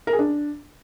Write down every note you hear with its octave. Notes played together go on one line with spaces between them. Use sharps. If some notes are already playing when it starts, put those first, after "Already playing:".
A#4
G#4
D4